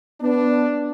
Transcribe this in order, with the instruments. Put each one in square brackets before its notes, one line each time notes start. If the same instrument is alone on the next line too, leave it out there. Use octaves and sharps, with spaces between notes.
[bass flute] B3 [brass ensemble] D4